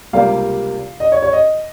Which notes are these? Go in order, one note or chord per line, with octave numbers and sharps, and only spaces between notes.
C#2 C3 G3 A#3 F5
D#5
C#5
C#5
D#5